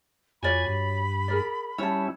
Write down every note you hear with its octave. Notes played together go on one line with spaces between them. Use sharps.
F2 F#4 C#5 D5 G#5 B5
G2
G#4 A#4 D5
G3 C#4 E4 C#5 A5